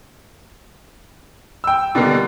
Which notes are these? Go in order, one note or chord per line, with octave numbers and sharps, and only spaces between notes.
G5 E6
B2 D3 D#3 G3 A#3